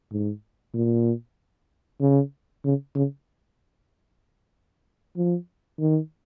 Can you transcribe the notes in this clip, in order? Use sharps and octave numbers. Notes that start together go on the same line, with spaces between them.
G#2
A#2
C#3
C#3
C#3
F3
D#3